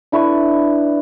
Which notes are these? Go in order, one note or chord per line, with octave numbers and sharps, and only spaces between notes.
D4 E4 B4 C#6